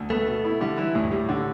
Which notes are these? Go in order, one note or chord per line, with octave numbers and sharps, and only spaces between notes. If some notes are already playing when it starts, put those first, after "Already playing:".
Already playing: D2
A3 B3
B2
E4
D3 G3
E3 E4
D2 A2
G2
A2 G3
D3